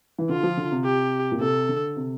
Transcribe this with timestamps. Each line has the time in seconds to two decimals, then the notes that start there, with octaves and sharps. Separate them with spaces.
0.19 E3
0.29 D3 F4
0.43 F3
0.57 D3
0.72 C3
0.84 G4
1.32 A#2
1.40 C3 A4
1.69 D3
1.96 C3